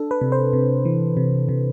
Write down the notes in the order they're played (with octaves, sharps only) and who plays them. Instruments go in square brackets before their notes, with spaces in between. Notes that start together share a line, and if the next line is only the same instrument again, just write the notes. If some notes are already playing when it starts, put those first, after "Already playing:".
Already playing: [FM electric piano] D4 A4
B4
C3
C5
C3
E3
C3
C3